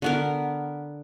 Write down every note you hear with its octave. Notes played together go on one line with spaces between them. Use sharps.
D3 B3 A#4